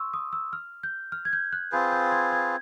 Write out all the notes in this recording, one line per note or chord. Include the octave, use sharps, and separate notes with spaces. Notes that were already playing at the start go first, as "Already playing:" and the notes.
Already playing: C6 C#6 E6
D#6
E6
F6
G6
F6
G#6
G6
F#6
C4 F4 G#4 B4 G6
G6
G#6
G#6